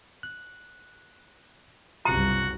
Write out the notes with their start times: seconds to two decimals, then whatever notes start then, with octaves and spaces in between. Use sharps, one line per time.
0.23 F#6
2.05 F#1 C2 G2 C3 F4 F#4 A#5